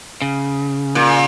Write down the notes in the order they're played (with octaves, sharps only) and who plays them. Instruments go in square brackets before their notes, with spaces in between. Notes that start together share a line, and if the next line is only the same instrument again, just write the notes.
[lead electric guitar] C#3
[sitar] A#2